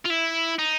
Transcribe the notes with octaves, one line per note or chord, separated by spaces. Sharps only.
F4
E4
D#4